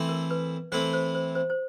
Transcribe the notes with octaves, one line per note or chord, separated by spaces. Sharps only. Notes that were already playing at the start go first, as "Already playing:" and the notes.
Already playing: E3 A3 C4 E4
A#4
B4
E3 A3 C4 E4 C5
C5
C5
C5
C5